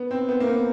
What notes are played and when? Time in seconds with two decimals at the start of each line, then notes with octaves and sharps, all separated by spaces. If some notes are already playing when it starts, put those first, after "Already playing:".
Already playing: B3
0.11 C4
0.29 B3
0.40 A#3
0.47 B3